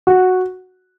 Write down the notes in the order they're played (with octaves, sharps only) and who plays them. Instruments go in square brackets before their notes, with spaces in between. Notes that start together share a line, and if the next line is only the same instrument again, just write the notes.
[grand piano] F#4